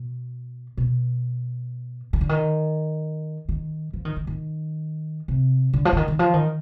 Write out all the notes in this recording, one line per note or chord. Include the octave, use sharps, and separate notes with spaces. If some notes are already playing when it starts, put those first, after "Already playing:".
Already playing: B2
B2
D#3
D3
D#3
D#3
F3
D#3
D#3
D#3
C3
D3
F3
D3
D#3
D#3
F3
D#3